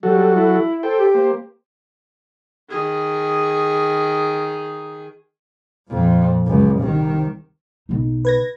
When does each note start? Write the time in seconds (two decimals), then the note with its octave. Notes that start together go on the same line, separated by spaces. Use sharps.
0.03 F#3 G3 F#4 A4
0.35 E4
0.83 A4 C5 G5
0.99 G4
1.14 A#3 C5
2.70 D#3 G#4
5.89 F2 A#2
6.46 C#2 F#2
6.79 C2 D#3
7.89 B1 D#4
8.25 B4 G#6 A#6